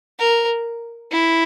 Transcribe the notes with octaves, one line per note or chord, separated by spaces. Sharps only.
A#4
E4